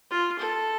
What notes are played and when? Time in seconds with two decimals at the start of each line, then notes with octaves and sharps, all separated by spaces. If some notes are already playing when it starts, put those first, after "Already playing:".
0.11 F4
0.39 A4